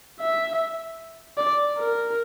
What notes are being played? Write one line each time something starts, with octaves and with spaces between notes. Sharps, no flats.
E5
D5
A#4